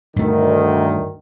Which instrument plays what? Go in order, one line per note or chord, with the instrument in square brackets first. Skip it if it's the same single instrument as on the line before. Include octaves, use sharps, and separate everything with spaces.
[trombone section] D2 D#3 [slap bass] G2 A3